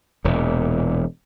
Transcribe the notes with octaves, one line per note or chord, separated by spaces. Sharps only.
E1 E2 A#2